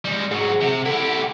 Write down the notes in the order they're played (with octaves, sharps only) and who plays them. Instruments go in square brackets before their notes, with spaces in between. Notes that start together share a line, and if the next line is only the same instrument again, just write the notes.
[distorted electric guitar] G3 G#3
[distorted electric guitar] G#2 F#3 [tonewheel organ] G#4 F#5
[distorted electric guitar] C3
[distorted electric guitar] E4 G4 [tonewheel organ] A4 F#5